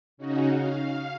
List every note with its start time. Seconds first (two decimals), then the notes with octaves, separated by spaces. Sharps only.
0.17 C#3 C#4 D#4 F#4
0.53 F5